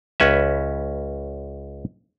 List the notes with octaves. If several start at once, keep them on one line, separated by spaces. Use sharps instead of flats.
C#2 C#4 B4 E5